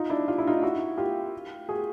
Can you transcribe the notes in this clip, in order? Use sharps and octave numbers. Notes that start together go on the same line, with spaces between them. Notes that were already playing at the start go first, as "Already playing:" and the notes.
Already playing: D#4 F4
D4 E4
F4
E4
D#4 F4
E4 F#4
F4 G4
F#4 G#4